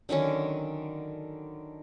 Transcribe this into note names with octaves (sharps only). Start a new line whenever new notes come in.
D3 D#3 F#3 C#4